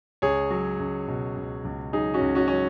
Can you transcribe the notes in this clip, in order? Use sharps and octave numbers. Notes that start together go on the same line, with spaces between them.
C#2 G#4 C#5
F#3
C#2
B2
C#2
C#2
F#3 D#4 G#4
C#4 F#4
C#2
C#4 F#4
F#3 C#4